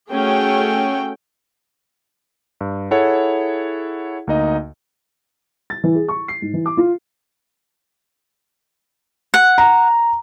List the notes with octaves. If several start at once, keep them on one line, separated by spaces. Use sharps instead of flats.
A3 C#4 F#4 G#4 G5
G2
E4 G#4 A4 C#5 F#5
D2 A#3 D#4 D#5
A6
E3
G#4
C#6
C7
G#2
E3
D6
F4
F#5
A#5